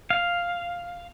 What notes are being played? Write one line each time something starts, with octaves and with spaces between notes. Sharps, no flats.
F5